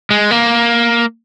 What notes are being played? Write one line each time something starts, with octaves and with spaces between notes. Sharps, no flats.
G#3
A#3